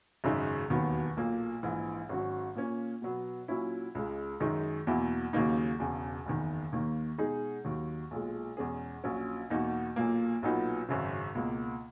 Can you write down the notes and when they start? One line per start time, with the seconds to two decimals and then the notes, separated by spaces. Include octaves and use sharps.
0.24 G#1 F#2 C#3 G#3 D#4
0.70 E1 D#2 D#3 F#3 B3
1.17 B1 A#2 A#3
1.63 A#1 G#2 E3
2.09 G#1 G#2 F#3 C#4 F#4
2.56 A#2 A#3 C#4
3.02 B2 F#3 B3
3.48 A#2 F#3 C#4 E4
3.95 C#2 C#3 G#3
4.40 F#2 D#3 G#3 D#4
4.87 E2 B2 F#3 A#3 E4
5.33 D#2 C#3 F#3 A#3 D#4
5.79 E1 E2 C#3
6.26 F#1 E2 D#3
6.72 D#2 D#3 A#3
7.18 B2 G#3 D#4 G#4
7.64 D#2 D#3 F#3
8.11 B1 A#2 G#3
8.57 E2 B2 G#3 C#4 G#4
9.04 A#1 A#2 F#3 C#4
9.50 E2 B2 A#3 D#4 F#4
9.96 B1 A#2 A#3
10.42 B1 A#2 F#3 B3 D#4
10.88 G#1 F#2 C#3
11.35 C#2 B2 A#3